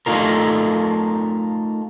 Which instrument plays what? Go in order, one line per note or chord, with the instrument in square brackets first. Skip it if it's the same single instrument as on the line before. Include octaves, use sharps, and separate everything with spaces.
[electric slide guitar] A3 D#4 F4 A#4